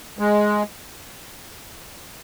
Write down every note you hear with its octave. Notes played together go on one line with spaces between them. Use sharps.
G#3